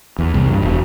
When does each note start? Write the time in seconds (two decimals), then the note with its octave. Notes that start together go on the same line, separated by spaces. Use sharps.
0.19 E2
0.34 C2
0.49 G2
0.62 E1